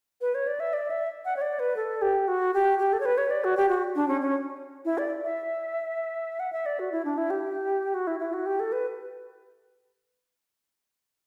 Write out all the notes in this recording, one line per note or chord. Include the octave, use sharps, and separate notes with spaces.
B4
C#5
D5
E5
D5
E5
F#5
C#5
D5
B4
A4
G4
F#4
G4
G4
A4
C#5
B4
C#5
D5
F#4
G4
F#4
D4
C#4
C#4
E4
D5
E5
F#5
E5
D5
F#4
E4
D4
E4
G4
F#4
E4
E4
F#4
G4
A4
B4